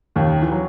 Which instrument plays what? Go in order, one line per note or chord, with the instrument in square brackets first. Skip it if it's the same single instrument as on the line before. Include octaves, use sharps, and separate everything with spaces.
[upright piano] D#2 D#3
E3
F#3